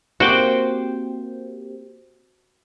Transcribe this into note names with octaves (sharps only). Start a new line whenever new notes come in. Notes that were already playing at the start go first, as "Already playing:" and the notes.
A#3 C4 F#4 G4 C5 G5 D6